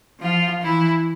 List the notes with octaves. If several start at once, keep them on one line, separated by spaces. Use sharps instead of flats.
F3 F4
E3 E4